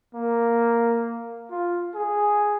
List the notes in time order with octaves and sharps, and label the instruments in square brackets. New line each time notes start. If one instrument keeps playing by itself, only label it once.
[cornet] A#3
F4
G#4